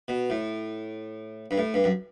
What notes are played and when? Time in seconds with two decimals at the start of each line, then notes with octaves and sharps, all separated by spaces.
0.08 B2
0.30 A2
1.51 G2
1.58 A2
1.74 G2
1.84 F#2